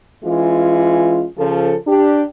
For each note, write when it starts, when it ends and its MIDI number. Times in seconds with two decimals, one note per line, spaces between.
0.24 1.24 52
0.24 1.24 56
0.24 1.24 61
0.24 1.24 65
1.38 1.74 49
1.38 1.74 53
1.38 1.74 69
1.87 2.23 62
1.87 2.23 67